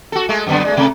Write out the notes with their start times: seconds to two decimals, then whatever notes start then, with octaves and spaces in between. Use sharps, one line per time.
0.12 F#4 A4
0.29 G#3 A3
0.47 F#2 D3 B3
0.65 G#3 A3
0.77 C3 A3